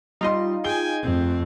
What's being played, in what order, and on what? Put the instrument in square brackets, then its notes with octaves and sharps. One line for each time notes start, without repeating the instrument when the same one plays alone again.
[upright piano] G3 C6 [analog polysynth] D#4 F4 D#5
[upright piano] G#4 G7 [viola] G5 G#5
[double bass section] F2 [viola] A3 C4